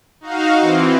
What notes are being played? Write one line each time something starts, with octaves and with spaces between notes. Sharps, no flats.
D#4 F#4 F5
E3 C4